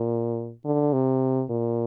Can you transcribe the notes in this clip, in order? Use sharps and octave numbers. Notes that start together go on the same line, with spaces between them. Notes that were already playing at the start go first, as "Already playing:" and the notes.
Already playing: A#2
D3
C3
A#2